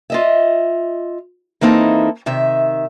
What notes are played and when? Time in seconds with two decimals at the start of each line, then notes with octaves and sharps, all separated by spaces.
0.10 F4 D#5 E5
1.61 E3 A#3 C4 D#4 E4 A4
2.26 C3 D#3 E5